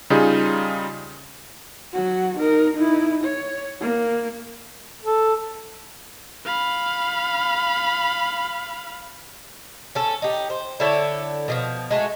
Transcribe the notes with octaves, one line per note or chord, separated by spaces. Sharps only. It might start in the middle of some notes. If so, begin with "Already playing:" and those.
C#3 G3 D#4 F4 G#4
F#3 F#4
D#4 A#4
D#4 E4
C#5
A#3
A4
F5 B5
C#4 A4
D#4 G4
C5
D3 E4 A4 C#5
B2 D3 F3
G#3 A3 F#4